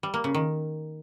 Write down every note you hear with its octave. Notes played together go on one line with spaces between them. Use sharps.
G3
A#3
C#3
D#3